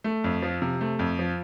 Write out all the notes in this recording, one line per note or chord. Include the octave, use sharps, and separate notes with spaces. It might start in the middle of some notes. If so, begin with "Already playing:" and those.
A3
F2
F3
C3
A3
F2
F3